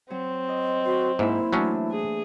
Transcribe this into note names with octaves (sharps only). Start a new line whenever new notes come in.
F#3 C4
D#5
F#4 C5
G#2 A#3 E4 E5 F#5
E3 F#3 A3 C#4 D4
G#4